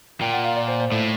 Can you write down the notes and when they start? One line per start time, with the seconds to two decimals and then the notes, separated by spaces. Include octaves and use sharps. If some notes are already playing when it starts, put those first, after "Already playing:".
0.21 A#2 G5
0.33 F#5
0.44 F5
0.56 D5
0.68 C5
0.80 C5
0.92 A2